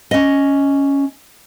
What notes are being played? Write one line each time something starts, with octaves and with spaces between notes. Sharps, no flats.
C#4 D#5